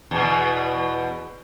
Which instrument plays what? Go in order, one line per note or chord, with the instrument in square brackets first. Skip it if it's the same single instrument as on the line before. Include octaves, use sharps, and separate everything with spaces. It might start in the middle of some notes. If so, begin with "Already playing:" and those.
[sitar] E2 B2